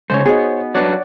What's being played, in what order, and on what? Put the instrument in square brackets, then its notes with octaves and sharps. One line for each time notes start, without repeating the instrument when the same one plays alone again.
[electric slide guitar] C#3 G#3 A3 [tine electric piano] C5 C#5
[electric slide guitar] B3 [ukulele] D#4 F#4 G#4
[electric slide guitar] F#3 D4 B4 [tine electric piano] C#5 D5 F#5